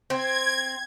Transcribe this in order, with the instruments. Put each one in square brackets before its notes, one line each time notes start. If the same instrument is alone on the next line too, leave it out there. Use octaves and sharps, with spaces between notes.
[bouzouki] C4 [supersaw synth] G#6